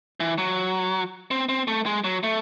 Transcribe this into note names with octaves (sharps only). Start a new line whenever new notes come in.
E3
F#3
C4
C4
A3
G#3
F#3
A3